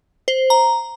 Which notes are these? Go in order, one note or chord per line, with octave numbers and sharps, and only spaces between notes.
C5
A#5